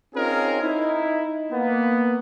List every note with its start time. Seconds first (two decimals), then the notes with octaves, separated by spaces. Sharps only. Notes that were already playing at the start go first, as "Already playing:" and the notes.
0.15 C4 C#4 D#4 F4 G#4 A#4
0.62 D#4 E4
1.52 A#3 B3